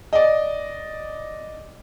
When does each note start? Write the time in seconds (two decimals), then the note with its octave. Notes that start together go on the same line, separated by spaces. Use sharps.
0.13 D5 D#5